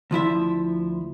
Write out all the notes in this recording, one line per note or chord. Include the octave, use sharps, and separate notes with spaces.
D2 F3 E4 E5